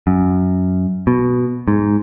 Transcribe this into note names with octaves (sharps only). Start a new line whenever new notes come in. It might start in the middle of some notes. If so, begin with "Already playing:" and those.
F#2
B2
G#2